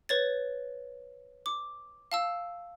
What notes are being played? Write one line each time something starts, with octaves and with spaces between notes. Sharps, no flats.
B4 C#5 A6
D6
F5 A5 E6